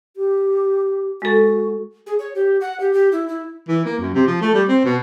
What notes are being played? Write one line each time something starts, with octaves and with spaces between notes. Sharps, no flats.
G4
G#3 F#4 A4
G#4
C#5
G4
F#5
G4
G4
E4
E4
E3
A#3
F#2
C3
F3
A3
G3
C4
B2